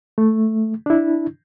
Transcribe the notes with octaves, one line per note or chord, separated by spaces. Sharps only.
A3
D4 E4